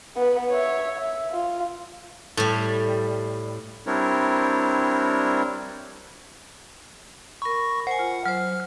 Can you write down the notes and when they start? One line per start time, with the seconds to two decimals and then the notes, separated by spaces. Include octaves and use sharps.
0.16 B3 B4
0.50 C#5 E5
0.99 E5
1.31 F4
2.37 A2 G3
3.87 G3 C4 D4 E4 A#4 C#5
7.42 A#4 B5 C#6
7.87 C5 F#5 G#5
7.99 F4
8.25 F#3 C5 F6